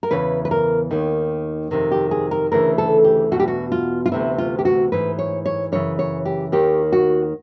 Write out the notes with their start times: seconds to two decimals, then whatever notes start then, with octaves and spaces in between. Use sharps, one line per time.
0.03 A#4
0.11 E2 C#3 E3 B4
0.45 B4
0.51 A#4
0.91 D#2 D#3
1.71 F2 C3 D#3
1.92 G4
2.11 G#4
2.31 A#4
2.51 D2 C#3 E3 A#4
2.78 A4
3.04 G4
3.32 E2 B2 F#4
3.40 G4
3.48 F#4
3.72 F4
4.06 F4
4.12 D2 C3 E3 E4
4.38 F4
4.59 G4
4.65 F#4
4.92 G#2 E3 B4
5.19 C#5
5.46 C#5
5.72 F#2 C#3 E3 C#5
5.99 C#5
6.25 G4
6.52 D#2 D#3 G4
6.92 F#4